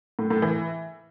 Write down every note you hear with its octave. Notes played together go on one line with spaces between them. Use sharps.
A2
A2
E3